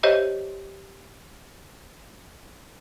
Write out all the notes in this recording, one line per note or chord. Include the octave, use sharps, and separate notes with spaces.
G4 C5 C#5 D#5 E5